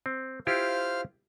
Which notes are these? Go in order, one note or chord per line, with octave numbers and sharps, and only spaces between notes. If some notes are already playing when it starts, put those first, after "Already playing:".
C4
E4 F4 G4 C5 F5 F6